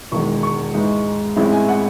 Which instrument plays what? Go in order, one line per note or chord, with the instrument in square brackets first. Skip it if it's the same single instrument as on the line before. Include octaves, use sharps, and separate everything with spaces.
[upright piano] E1 E2 D#3 G#3 C#6
C#6
G#2 E3 G#3 D#4
A1 A2 G#3 C4 E4
G#5
F#5